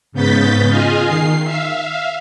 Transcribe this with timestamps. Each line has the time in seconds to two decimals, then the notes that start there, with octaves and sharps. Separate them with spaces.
0.12 G#2 C#3 B3 G6 A6 B6
0.68 F4 G#4 D#5 F5 G#5
1.05 D#3 C7
1.44 E5 F5